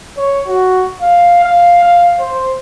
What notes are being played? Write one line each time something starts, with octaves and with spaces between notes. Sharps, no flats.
C#5
F#4
F5
F5
F5
C5